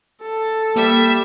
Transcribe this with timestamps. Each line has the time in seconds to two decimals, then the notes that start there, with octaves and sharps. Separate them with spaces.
0.22 A4
0.76 G3 A#3 E5